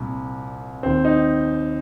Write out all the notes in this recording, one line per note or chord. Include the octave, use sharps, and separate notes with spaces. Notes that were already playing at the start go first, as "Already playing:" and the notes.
Already playing: C2 A#2
D#2 D#3 C4
D#4